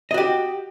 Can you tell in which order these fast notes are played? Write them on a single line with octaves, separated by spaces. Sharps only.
D#5 F#4 G4